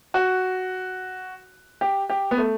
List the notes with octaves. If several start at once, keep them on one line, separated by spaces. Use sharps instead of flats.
F#4
G4
G4
B3
A3